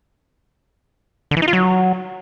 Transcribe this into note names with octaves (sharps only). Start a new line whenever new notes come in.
D3
E3
D#4
F4
F#3